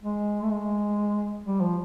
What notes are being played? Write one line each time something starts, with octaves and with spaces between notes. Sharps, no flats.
G#3
A3
G#3
G3
F3